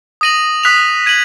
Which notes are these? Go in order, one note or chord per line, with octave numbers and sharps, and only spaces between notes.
D#6 A#6 D#7 F#7
D#6 F#6 B6 F7
G#6 D#7 F#7